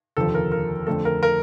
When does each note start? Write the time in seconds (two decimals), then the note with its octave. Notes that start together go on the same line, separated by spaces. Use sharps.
0.17 F1 D#2 D3 F3 A4
0.35 A#4
0.52 A#4
0.87 F2 D3 F3 A3 A4
1.05 A#4
1.23 A#4